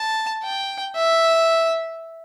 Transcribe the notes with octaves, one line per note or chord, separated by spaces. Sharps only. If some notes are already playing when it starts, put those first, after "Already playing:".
Already playing: A5
G5
E5